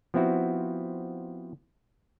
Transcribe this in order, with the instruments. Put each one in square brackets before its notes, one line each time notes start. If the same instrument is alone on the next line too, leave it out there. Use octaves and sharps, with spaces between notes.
[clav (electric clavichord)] F3 B3 C4 E4 F#4